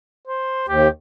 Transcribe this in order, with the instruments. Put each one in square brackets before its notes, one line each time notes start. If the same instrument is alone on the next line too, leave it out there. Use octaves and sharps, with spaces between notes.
[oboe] C5
[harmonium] D#2 [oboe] G4